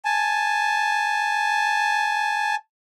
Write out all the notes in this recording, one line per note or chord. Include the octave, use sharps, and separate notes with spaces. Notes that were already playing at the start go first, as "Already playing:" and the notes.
G#5 A5